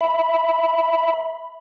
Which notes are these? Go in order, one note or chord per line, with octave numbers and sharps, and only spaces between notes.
E5 B5